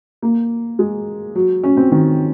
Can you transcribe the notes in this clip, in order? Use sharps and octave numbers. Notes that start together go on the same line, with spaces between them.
A#3
G#3
F#3
C#4
C4
D#3